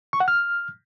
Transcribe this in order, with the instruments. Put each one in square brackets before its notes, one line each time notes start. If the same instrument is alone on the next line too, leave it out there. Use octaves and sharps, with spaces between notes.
[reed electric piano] C#6
F#5
F6